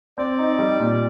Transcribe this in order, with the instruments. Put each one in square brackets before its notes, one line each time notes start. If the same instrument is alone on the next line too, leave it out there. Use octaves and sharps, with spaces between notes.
[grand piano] C4 [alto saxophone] D5
[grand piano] D#4
G3
A#2